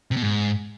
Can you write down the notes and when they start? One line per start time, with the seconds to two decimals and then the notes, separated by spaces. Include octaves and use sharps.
0.11 C3
0.17 B2
0.22 G#2